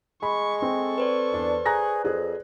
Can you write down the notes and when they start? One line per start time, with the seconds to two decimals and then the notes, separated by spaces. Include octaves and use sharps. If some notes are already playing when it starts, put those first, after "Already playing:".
0.23 G#3 B5 C#6
0.62 C4 A4 C#6
0.98 B4 C5 D5
1.33 E2 D4
1.66 G#4 A#5 F#6 A#6
2.05 F2 G#4